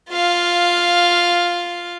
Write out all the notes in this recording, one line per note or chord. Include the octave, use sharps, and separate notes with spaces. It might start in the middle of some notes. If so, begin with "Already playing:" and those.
F4 F5